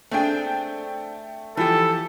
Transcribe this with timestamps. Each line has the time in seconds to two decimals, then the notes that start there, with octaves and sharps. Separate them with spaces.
0.11 A3 C4 D4 G#4 G5
1.57 E3 F3 G4 A4